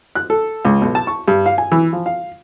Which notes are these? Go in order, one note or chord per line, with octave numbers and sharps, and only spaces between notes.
F#6
A4
C#2
B1
A5
C#6
G2
F5
G#5
E3
F3
F5